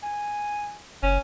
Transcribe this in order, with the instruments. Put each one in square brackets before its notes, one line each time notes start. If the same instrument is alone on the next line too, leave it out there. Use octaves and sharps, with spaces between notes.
[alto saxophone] G#5
[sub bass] F#1 [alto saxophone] C#4